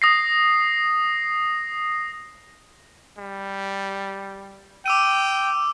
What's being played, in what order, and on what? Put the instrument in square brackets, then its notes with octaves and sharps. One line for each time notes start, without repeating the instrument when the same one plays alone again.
[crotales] D#6 A#6 C7
[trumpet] G3
[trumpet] G5 [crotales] D6 E6 D#7